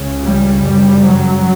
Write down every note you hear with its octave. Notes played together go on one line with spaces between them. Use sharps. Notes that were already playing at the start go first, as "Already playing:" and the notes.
Already playing: C#2 C#3
G3
F#2 C#3 G3
F#3